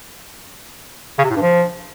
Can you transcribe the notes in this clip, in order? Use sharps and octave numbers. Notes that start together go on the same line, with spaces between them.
C#3
C3
A2
G2
F3